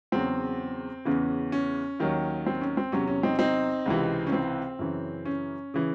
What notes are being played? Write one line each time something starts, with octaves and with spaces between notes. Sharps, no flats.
E2 C#3 F#3 C4
E2 C#3 E3 C#4
C#4
D#2 D#3 F#3
C4
C#4
C4
E2 C3 F#3 C#4
C#4
C4 D#4
C4 D#4
C#2 C3 E3
C#4
C4
F#2 C#3 E3
C#4
C#3 E3